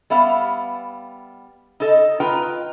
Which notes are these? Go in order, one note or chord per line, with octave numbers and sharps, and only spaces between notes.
G3 B3 E5 F5
D#4 A4 D#5
D#4 F4 B4 G5 A#5